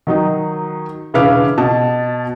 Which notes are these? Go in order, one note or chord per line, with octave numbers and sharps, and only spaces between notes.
D#3 F#3 D#4
E1 C#3 E4 B4 F5 D6
B2 A5